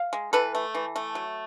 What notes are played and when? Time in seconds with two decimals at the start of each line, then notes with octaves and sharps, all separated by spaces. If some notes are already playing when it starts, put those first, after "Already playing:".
Already playing: F5
0.13 G#3
0.33 E3 A4 B4
0.55 A3
0.75 E3
0.96 A3
1.15 F#3